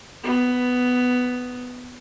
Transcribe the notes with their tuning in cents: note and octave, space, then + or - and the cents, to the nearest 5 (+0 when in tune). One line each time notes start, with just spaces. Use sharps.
B3 +10